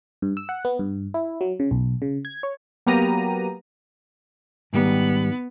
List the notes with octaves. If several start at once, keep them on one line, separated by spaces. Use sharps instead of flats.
G2
E6
F#5
B3
G2
E4
F#3
C#3
B1
C#3
G#6
C#5
F#3 A#3 B3 G4 A#5 D#7
G#2 D#3 G3 B3